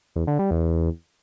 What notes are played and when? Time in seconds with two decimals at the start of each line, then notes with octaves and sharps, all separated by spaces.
0.16 E2
0.27 D3
0.39 G3
0.51 E2